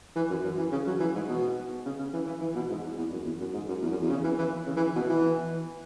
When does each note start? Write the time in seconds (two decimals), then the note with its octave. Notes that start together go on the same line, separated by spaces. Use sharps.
0.16 E3
0.30 F#2
0.44 F#2
0.58 E3
0.72 C#3
0.86 F#3
1.00 E3
1.15 G#2
1.29 B2
1.85 C#3
1.99 C#3
2.13 E3
2.27 E3
2.41 E3
2.55 B2
2.69 G#2
2.83 E2
2.98 E2
3.12 F#2
3.25 E2
3.40 F#2
3.53 G#2
3.68 F#2
3.82 E2
3.91 F#2
4.01 E2
4.10 C#3
4.24 E3
4.38 E3
4.66 C#3
4.76 E3
4.95 B2
5.09 E3